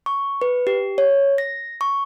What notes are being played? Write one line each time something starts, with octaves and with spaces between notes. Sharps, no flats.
C#6
B4
G4
C#5
A#6
C#6